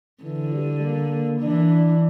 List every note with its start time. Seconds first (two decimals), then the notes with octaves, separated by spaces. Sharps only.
0.24 D3 E3
0.54 G3
0.83 A#3
1.41 E3 D4